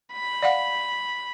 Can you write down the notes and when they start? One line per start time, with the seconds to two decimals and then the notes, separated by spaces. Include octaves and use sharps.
0.13 B5
0.42 D5 F5 F#5